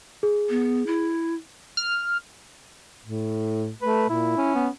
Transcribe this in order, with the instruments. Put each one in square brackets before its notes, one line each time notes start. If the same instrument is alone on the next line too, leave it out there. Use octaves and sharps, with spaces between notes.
[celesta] G#4
[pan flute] B3
E4
[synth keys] F6
[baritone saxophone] A2
[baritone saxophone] A3 [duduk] B4
[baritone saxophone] A#2 [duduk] E4
[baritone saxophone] C#4
[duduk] B3